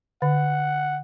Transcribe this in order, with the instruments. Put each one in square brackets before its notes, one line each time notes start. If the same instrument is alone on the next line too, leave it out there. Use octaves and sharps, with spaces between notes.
[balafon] D3 [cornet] F#5